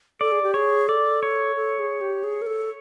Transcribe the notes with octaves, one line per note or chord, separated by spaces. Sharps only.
A4 D5
G#4
G4
G#4 C#5
A4 D5
C#5
A4
G#4
G4
G#4
A#4
A4